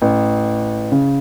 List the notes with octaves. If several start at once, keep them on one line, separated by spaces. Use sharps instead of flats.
A1
C#3